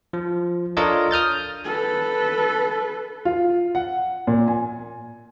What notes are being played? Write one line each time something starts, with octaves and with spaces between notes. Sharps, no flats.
F3
D4 F4 A4 A#4 C#5 D#5
D#6 F6 G6 A6
A4 B4
F4
F#5
A#2
G#5